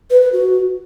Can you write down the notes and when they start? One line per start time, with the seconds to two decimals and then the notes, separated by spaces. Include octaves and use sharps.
0.10 B4
0.21 B4
0.33 F#4